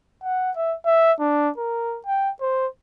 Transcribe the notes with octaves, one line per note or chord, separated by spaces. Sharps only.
F#5
E5
E5
D4
A#4
G5
C5